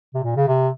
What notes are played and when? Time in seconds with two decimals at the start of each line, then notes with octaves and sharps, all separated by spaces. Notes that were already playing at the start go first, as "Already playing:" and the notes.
0.14 C3
0.23 A#2
0.36 C#3
0.47 C3